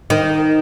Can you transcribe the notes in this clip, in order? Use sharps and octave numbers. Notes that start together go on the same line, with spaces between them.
D#3